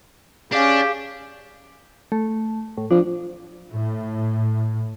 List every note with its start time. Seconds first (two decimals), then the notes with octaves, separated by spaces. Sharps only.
0.52 C#4 D4 G4 G#4 F5
2.12 A3
2.77 A2
2.91 F3 D4
3.73 A2